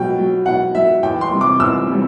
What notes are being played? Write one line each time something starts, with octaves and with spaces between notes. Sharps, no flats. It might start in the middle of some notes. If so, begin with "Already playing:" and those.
Already playing: B2 F#3 G5
F#3
B2 F#5
F#3 E5
E2 G5
C6
C3 G3
D6
E2 E6
C3 G3